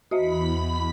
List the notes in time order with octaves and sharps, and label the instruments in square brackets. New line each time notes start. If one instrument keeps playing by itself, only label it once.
[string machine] E2 B5 B6 [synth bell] F#4 D#5 E5